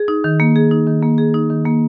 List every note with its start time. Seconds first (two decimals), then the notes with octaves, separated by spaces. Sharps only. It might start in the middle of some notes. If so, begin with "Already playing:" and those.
Already playing: G#4
0.08 D#4
0.24 D#3
0.40 A#3
0.56 G#4
0.71 D#4
0.87 D#3
1.03 A#3
1.18 G#4
1.34 D#4
1.50 D#3
1.66 A#3